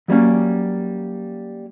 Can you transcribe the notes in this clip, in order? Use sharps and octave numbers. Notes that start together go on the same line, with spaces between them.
F#3 G3 A#3 C#4